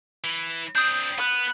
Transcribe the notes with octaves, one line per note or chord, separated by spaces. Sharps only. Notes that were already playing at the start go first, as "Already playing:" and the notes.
E3
C4 D4 D#6 G6
B3 F#6